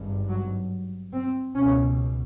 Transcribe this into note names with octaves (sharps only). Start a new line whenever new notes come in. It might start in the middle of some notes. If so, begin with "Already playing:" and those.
Already playing: G#1 G2
F#3
C4
C#2 B2 C#4